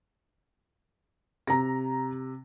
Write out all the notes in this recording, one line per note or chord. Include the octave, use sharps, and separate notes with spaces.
C3 A#5 A#6